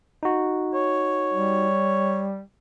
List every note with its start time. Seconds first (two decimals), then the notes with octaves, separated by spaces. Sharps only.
0.23 D#4 F#4
0.74 C#5
1.34 G3